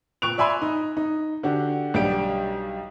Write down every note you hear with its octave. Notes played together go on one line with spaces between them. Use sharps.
A#2 C#6 F#6 D7 F7
D5 E5 G#5 B5 C6 E6
D#4
D#4
D3 D4 F#4 G4
B1 G3 D4 G4 D7